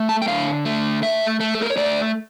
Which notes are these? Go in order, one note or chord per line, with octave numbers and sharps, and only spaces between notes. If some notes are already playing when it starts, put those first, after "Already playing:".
Already playing: A3
A5
G5
D3 F5
A3
A3 E5
A3
A4
A#4
C#5
A3 D5